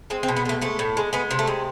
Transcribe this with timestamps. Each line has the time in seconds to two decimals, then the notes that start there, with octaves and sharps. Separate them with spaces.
0.10 G#3 C4
0.23 C4
0.28 B2
0.36 B3
0.45 G#3 A3
0.61 G#3 A3
0.79 A2
0.97 G#3
1.13 G#3 B3
1.31 C3
1.39 A3
1.47 G#3